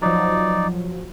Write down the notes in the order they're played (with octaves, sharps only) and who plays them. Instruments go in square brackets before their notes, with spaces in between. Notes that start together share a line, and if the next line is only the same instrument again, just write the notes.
[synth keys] F3 F#3 [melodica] D#4 D5